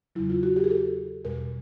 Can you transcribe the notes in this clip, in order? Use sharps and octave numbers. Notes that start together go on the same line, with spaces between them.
E2 C#3 F#3 E4
F4
F#4
G4
G#4
A4
E2 B2 G3 A#4